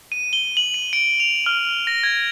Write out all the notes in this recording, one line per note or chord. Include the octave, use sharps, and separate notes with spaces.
D#7
G7
F#7
D#7
D7
F7
F6
A#6
G#6